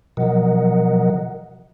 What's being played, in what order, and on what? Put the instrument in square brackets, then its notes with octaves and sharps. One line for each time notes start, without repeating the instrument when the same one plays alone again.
[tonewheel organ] B2 F3 F#3 A#4 D#5 F#5